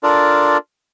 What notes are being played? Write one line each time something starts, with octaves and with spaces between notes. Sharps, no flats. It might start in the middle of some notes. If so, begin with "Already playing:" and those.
D4 F4 A4 A#4 D5